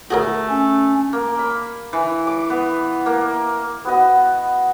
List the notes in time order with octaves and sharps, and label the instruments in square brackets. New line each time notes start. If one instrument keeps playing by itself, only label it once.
[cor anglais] A3 [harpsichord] F#4 G#4 A#4
[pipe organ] C#4
[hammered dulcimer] A#3
B5
E3
D6
B3
A#3
[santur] B3 F#4 D#5